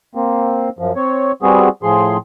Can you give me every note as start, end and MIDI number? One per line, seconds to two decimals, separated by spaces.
0.15 0.69 58
0.15 0.69 60
0.79 0.92 42
0.79 0.92 53
0.96 1.32 60
0.96 1.32 73
1.42 1.69 55
1.42 1.69 59
1.42 1.69 60
1.42 1.69 66
1.42 1.69 68
1.83 2.17 45
1.83 2.17 53
1.83 2.17 68
1.83 2.17 84